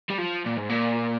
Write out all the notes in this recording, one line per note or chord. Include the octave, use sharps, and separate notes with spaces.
G3
F3
A#2
G#2
A#2